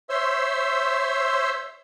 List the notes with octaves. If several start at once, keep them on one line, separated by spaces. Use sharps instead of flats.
C5 C#5 E5 C6 E6